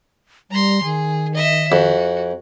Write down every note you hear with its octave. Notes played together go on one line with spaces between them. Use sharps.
G3 A#5 C6
D#3 G#4
D#5 E5
F2 F#4